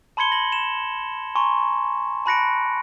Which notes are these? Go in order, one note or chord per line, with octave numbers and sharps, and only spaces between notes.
A5 B5 C6 G#6 C#7 G7
A#6 F#7
E7
G#5 A#5 C6 C#6
C#6
A5 B5 F#6 A#6 C#7 D7